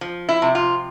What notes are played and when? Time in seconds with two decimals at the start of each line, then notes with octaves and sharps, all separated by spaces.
0.01 F3
0.29 E4
0.42 C3
0.55 F4